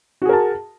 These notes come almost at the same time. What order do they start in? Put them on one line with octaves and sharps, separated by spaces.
F#4 G#4 A#4 A5